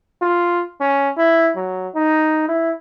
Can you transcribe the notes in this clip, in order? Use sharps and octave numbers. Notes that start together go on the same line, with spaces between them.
F4
C#4
E4
F#3
D#4
E4